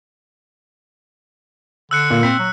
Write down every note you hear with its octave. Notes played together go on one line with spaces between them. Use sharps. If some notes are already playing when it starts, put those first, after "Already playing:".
D3 E6 F#6 C#7
A#2
C4 B6
F#3